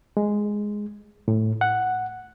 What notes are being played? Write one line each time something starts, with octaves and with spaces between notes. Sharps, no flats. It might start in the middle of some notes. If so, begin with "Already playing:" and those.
G#3
A2
F#5